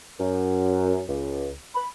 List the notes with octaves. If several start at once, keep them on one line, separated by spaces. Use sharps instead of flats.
F#2
C#2
B5